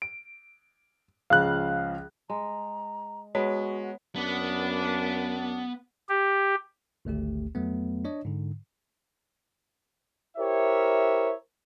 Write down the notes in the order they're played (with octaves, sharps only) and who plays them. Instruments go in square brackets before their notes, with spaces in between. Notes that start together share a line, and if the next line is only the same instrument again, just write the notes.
[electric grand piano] D7
[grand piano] C#2 C#3 F3 [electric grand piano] F5 F#6
[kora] G#3 [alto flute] A#5
[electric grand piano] G#3 [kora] B3 [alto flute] F#4 [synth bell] C#5
[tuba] F#2 [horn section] A#3 D4 [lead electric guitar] B3
[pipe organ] G4
[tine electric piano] G#1 D2 A3 G4
F2 F#3 A3 B3
D4 C#5 D#5
G#2 D3
[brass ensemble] E4 G4 A#4 C5 C#5 E5